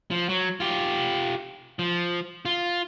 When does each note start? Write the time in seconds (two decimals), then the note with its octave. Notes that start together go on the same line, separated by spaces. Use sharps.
0.11 F3
0.29 F#3
0.60 F4 G4
1.79 F3
2.45 F4